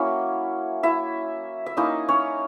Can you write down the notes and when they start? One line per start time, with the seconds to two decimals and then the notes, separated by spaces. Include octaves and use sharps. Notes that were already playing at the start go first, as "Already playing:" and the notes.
Already playing: F#3 A#3 C#4 E4 C#5
0.83 E4 E5
1.66 E5
1.77 A#3 C#4 D#4 E4 D#5
2.09 C#4 C#5